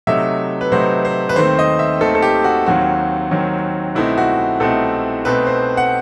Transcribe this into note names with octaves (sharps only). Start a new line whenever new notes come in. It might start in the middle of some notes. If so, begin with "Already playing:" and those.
C3 F#3 A3 D#4 E5
B4
C3 F#3 A3 D#4 C5
C5
B4
D#2 D#3 A3 C4 C5
D#5
E5
D#2 D#3 A3 C4 A4
A4
G4
F#4
D#2 D#3 F#3 C4 F#4
D#2 D#3 F#3 C4
C2 B2 A3 C4 D#4 E4
F#4
C2 B2 A3 C4 D#4 A4
B2 A3 C4 D#4 B4
C5
F#5